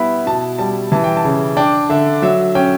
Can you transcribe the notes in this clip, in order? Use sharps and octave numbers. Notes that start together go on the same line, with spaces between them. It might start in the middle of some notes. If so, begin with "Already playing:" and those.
Already playing: G3 B3 E4 B5
B2 A5
G3 A5
E3 A5
G5
A5
C#3
D4 G5
D3 E5
F#3 E5
C#4 G5